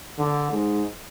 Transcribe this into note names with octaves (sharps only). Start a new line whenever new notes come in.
D3
G#2